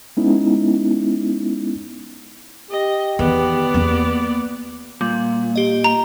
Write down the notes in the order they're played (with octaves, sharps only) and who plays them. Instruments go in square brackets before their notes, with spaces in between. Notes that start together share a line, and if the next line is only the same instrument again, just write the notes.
[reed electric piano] G#3 B3 C#4 D#4 E4
[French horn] G4 [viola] D#5
[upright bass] E2 D#3 [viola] B3 D5
[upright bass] E2 A#3
[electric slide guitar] A#2 [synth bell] G3
[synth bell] G4 D#5
[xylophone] A#5